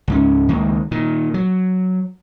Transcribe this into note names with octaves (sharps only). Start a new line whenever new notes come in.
C#2 G#2 C#4
C#2 D#3 G#3 A#3
A#2 D#3
F#3